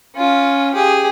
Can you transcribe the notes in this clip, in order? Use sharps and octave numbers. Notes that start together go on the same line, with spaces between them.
C#4 F4
G4 G#4